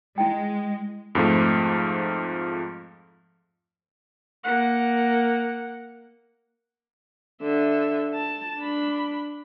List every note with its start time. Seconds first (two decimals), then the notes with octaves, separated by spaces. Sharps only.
0.18 G#3 E4 G5
1.15 F2 G#2 F3 A3
4.44 A#3 F#5
7.42 D3 E5
8.15 A5
8.60 D4 B5